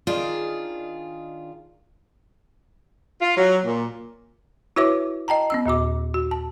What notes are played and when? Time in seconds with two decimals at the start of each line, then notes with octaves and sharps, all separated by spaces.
0.07 D#3 D4 F4 G#4
3.22 F4
3.37 F#3
3.65 A#2
4.76 E4 F#4 B4 C#5 E5 D6
5.28 D#5 G5 A5 A#5
5.50 B3 C#4 E6
5.66 D#2 A#2 F#4 D6
6.14 F#4
6.31 A5